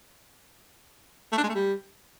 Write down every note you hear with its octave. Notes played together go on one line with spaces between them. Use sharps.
A3
D4
G#3
A3
G3